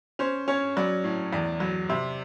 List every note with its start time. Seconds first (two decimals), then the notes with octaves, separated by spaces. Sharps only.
0.19 C#4 C5
0.48 C#4 C#5
0.77 F#3 D5
1.04 A2
1.33 E2 D5
1.60 F#3
1.89 C3